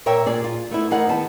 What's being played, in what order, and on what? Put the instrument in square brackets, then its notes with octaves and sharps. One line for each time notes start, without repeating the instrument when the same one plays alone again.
[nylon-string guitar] A#2 A#4 C#5 E5 G5
A#2 G#4 D5
F4
A3 B3 E4
D2 E3 D#4 G#4 A#4 F#5
D#3 B3 A5